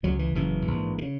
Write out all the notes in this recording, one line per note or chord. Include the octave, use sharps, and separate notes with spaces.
C#2 C#3 F#3
E3
F#1 F#2 C#3 E3
A#1 G#2
D#3
C#3